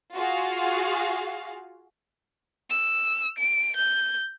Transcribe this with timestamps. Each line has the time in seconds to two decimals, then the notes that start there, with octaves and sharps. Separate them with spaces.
0.14 F4 F#4 G#4 F5
2.70 E6
3.38 D7
3.76 G6